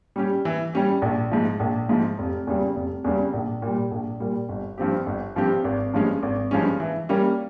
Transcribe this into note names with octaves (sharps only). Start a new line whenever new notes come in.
G3 C#4 G4
E3
G3 C#4 G4
A#1
G#2 F3
A#1
G#2 F3
F1
E2 C#3 G3
F1
E2 C#3 G3
A#1
A#2 G3
A#1
A#2 G3
G1
G2 F3 C4 G4
G1
G2 F3 C4 G4
G#1
G2 F3 G#3 C#4
G#1
G2 F3 G#3 C#4
E3
G3 A#3 C#4